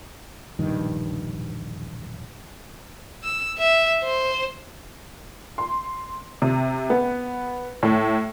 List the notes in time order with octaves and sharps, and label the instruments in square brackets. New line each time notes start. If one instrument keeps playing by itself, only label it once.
[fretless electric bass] E1 A#1 G2 D#3
[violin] E6
E5
C5
[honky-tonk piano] C6
C3
B3
A2